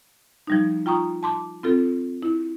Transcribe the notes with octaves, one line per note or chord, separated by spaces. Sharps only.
F3 G3 D#4
F4 G5 A#5 C#6 D#6
A5 C6 D6
C4 F4 A4
E4